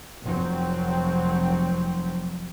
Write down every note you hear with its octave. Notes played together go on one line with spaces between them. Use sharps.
F1 F#3 C4